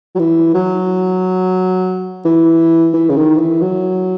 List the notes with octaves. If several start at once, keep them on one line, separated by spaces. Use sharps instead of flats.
F#3
E3
F#3
E3
E3
C#3
D#3
E3
F#3